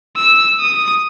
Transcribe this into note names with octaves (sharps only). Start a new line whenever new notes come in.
E6
D#6